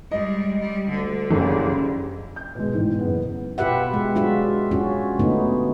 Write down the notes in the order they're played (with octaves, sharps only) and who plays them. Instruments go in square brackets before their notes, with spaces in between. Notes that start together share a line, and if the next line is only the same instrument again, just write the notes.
[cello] G3 G#3 [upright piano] D#5
[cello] G3
[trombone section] D2 [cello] D3
[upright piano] F#1 [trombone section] F#2 C#3 G3
[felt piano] G6
B2 G#3
A1 G#2
F#1 B3
[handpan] B2 F4 G4 B4 E5 F#5
G#3
F#3 G#3 D4 F4 F#4 E5
F#3 C#4 F4 F#4
D3 A3 B3 D#4